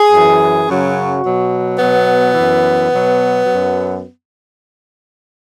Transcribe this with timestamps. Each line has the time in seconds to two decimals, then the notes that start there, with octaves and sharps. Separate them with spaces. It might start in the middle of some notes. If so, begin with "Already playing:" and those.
Already playing: G#4
0.12 F#2 E3
0.67 F#2 C#3 F#3 F#4
1.23 B2 F#3
1.79 B2 F#3 B3
2.34 F#2 E3
2.90 B2 F#3
3.45 F#2 F#3